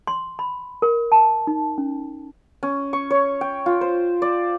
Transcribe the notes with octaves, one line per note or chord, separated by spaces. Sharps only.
C6
B5
A#4
A5
D#4
C#4
C#4
C#6
C#5
G5
F4
C5
D5